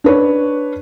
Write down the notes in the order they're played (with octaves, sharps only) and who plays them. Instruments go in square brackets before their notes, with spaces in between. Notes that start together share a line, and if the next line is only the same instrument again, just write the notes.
[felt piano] D4 B4 C#5